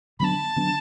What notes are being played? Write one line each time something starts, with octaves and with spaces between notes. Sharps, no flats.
D3 F#3 B3 D4 A5 B5
D3 F#3 B3 D4